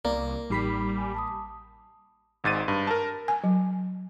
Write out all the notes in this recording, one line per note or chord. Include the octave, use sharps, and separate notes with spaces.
C2 A#3 D5
A1 G3 D#4 G4 B5 B6 C7
G#5
A5 D6 D#6
G#1 G#2 A6 D#7
G2
A#4 A5
G#5
F#3